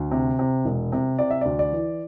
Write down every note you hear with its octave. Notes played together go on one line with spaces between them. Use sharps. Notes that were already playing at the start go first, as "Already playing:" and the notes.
Already playing: D2
C3
C3
E1
C3
C3 D5
E5
D2 D5
D5
E3